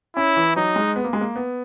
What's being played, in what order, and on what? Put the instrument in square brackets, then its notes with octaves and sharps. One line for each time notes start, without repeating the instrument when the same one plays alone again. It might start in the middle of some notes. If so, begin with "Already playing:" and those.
[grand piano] C#4 [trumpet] E4
[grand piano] E3
[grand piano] F#3 [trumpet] D#4
[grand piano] G#3
B3
A#3
G#3
A#3
B3